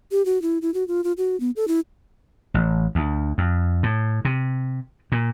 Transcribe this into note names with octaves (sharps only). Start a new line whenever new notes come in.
G4
F#4
E4
E4
F#4
F4
F4
F#4
B3
A4
E4
A1
D2
F2
A2
C3
A#2